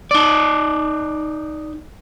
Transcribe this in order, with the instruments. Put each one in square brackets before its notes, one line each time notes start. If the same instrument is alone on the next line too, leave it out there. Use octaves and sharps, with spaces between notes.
[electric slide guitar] D#4 D5